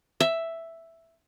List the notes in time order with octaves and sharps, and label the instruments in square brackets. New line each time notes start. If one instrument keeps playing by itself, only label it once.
[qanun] E5